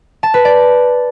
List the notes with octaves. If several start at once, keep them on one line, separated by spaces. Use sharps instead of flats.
A5
B4
D5